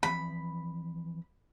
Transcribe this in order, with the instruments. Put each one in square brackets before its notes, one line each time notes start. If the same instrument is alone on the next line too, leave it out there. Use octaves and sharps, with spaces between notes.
[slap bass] E3 F3 C4 [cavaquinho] B5